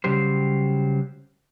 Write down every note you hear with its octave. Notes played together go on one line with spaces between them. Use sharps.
C#3 F#3 G3 G4 C5